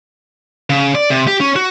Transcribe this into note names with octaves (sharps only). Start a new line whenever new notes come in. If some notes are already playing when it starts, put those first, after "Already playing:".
C#3
D5
C3
G4
C#4
F#4